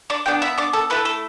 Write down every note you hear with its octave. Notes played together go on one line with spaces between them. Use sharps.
D4 D5
B3 D4 G4 G5
E4 E5
D4 D5
A4
A3 E4 A4 B4
A4